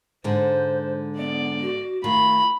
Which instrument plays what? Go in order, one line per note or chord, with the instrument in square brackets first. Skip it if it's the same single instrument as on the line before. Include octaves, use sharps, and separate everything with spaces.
[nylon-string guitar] G#2 D3 [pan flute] C5
[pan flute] B3 [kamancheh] D5
[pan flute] F#4
[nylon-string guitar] D#3 F4 [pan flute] A3 [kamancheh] B5